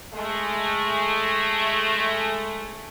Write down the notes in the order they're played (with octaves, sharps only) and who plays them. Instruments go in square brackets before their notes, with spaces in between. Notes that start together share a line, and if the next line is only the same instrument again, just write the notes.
[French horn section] G#3 A3